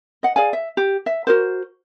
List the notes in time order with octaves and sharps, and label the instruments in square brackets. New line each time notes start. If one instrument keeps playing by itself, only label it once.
[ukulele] D#5 F#5
G#4 D5 F5 G#5
E5
G4
E5
F#4 A#4 C5